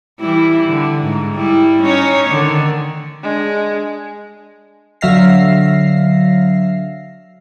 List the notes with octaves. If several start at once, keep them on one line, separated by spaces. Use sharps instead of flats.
E3 G3 E4
D3
G#2
G3 E4
C#4 D#4 C#5
D3 D#3
G#3 D4
D3 F#3 E5 F5 A#6 C7